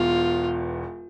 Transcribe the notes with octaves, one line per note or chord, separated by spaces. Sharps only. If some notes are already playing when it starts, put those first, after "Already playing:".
Already playing: E1 E2 B2 F4